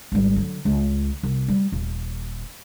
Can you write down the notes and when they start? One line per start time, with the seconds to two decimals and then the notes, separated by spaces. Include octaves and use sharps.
0.12 G#1 G3
0.36 D3 F#3
0.65 C#2
1.23 C2
1.48 G3
1.72 D#1